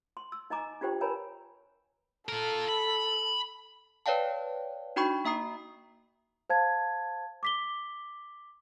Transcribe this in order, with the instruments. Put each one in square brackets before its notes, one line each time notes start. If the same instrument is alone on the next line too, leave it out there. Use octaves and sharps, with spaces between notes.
[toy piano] C6
E6
D#4 D#5 G#5 A#5 D6
D4 F4 G4 C5 G5
A#4 B4 C#5 G#5 A#5 B5
[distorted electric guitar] F4 A#4 [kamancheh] A4
[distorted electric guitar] B5
[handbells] B4 C#5 D5 F5 G5 A5
D4 D#4 F#4 G5 B5 C#6
A#3 E5 A#5 D#6 C7
[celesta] C5 F5 A5 G#6
D6 B6 G7